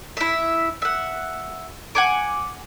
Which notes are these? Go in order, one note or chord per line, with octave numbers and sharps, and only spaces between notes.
E4 E5
E5 F#5
F#5 G#5 D6